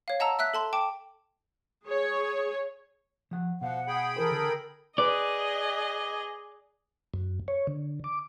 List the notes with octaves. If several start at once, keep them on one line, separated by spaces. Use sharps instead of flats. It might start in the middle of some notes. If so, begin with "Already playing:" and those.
C#5 F5
D#5 F#5 A5 A#5 E6
E5 E6 F#6 B6
A4 A5 C6
G5 A5 D6
G#4 C#5
F3 F#5
B2 F3 F5 F#5
G#4 G5 B5
E3 E4 A4 A#4 C5
D3
G#4 B4 D5 D#5
F#2
C#5
D3
D6